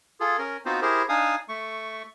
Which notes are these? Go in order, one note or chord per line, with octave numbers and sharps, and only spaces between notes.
F4 G#4 A4
C#4 A#4
B3 C4 D#4 F4 F#4 C5
E4 G4 G#4 A#4 C5
D4 D#4 F5 G#5 D#6
A3 C#6